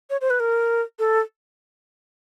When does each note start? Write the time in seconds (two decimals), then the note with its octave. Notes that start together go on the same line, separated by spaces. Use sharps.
0.10 C#5
0.21 C5
0.30 B4
0.40 A#4
0.99 A4